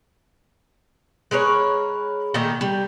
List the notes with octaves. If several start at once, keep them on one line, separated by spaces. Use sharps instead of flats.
G#3 A#4 B4 C#5
A#2 D#3 A3 D#4
G3